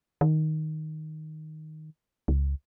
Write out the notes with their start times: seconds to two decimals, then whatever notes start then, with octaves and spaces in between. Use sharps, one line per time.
0.21 D#3
2.28 C#2